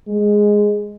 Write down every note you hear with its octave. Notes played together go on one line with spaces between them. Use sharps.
G#3